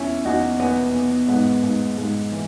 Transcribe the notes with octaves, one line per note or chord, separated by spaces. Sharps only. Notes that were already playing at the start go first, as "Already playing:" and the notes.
Already playing: E2 C#4 E4
E2 D#4 F#4
E2 B3
E2
G#2 B3
G#2
G#2
E3